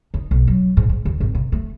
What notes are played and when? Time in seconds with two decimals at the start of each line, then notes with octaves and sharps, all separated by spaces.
0.14 D#4
0.31 B1
0.48 F#3
0.77 G#2
0.89 G#2
1.05 D#2
1.20 G#1
1.35 C3
1.52 A3